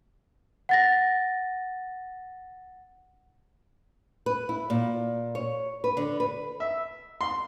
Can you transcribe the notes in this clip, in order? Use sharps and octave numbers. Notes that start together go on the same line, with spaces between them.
F#5 A6 A#6
B4
E4
A#2
C#5
B4
D3
B4
E5
C6